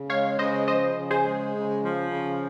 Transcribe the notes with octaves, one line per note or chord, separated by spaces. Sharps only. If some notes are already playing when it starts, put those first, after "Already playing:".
Already playing: C#3
G#3 C#5 F5
C#3 C5 D#5
F3 C5 D#5
C#3
G#4 C5
G#3
C#3
F3
C#3